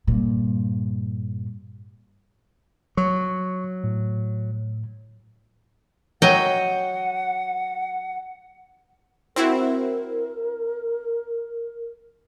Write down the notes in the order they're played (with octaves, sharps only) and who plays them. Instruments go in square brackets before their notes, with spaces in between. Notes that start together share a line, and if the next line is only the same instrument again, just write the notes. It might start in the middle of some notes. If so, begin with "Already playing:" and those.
[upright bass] G2 A#2
[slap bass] F#3 [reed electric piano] C#6
[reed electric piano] A2
[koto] F#3 D#5 G5 [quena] F#5
[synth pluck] C4 E4 F#4 [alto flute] A#4